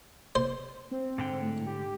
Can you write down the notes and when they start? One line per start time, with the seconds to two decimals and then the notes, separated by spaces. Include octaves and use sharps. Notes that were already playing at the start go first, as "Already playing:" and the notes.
0.35 C5
0.91 C4
1.18 G#2 D3 G5
1.42 A2
1.67 G4